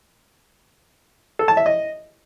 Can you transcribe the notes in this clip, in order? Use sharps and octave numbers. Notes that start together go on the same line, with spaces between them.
A4
A5
E5
D#5